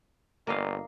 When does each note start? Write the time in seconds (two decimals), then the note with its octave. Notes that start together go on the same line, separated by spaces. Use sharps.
0.47 G1 A#3 D#5 F5